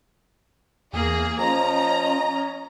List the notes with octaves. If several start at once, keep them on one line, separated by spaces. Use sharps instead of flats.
E2 A#3 G#4
F3 C#4 D#5 A#5